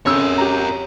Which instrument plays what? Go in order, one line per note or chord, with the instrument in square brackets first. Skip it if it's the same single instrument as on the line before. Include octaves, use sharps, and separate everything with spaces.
[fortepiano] F2 C#3 E6 [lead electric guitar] A#4 C#5
[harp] G4 A#5